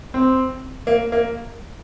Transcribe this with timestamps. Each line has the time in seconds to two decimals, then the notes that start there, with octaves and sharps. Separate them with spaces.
0.14 C4
0.87 A#3
1.12 A#3